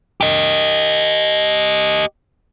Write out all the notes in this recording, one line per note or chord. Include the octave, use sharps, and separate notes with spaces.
G4 D#5